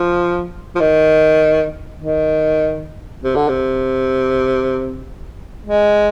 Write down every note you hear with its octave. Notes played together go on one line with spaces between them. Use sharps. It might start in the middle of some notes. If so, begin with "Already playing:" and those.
Already playing: F3
F3
D#3
D#3
C3
D3
C3
G#3